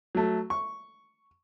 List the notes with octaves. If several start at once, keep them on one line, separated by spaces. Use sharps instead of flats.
F#3 A3
C#6